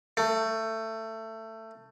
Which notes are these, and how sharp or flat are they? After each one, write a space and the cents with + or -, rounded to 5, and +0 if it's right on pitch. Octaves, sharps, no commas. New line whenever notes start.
A3 +20